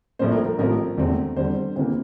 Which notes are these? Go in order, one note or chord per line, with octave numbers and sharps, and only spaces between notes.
A#1 A2 F3 A#3 C5
A#4
A#4
A1 A2 F3 C4 A#4
E1 E2 D3 A3 C4
E2 D3 G3 C4 C5
D2 C3 E3 A#3 C5